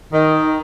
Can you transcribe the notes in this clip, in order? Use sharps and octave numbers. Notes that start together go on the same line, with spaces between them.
D#3